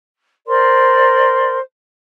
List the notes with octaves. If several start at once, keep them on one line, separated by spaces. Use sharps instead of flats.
A#4 C5 D5 C6